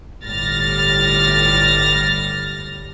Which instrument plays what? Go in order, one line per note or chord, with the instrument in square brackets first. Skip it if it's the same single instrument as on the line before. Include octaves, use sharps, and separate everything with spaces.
[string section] G1 A2 G3 F6 A6 A#6